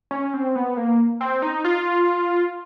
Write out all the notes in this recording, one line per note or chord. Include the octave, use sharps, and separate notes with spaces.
C#4
C4
B3
A#3
C4
D#4
F4